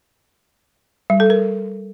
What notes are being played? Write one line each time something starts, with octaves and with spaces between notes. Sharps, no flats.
G3
A4
A#4